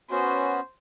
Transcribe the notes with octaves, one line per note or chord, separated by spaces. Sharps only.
B3 C#4 F#4 C5